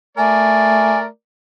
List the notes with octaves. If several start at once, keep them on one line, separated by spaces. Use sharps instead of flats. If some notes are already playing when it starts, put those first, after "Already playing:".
A3 A#4 D5 G#5